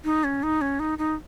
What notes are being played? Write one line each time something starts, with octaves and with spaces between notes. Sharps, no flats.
D#4
C#4
D#4
C#4
D#4
D#4